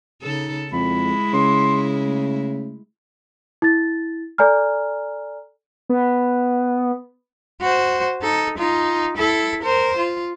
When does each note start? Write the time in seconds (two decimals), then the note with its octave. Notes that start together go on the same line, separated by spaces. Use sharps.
0.23 C#3 D#4 A4
0.72 F2 G#3 E4 B5
1.33 C#3 C6
2.04 A3
3.62 E4 A6
4.38 A4 D5 G#5 A#5 F6
5.89 B3
7.61 F#4 C5
8.22 D#4 A4
8.58 D#4 F4
9.17 E4 A4
9.63 A#4 C5
9.97 F4